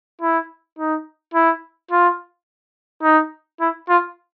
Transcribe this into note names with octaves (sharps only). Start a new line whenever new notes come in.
E4
D#4
E4
F4
D#4
E4
F4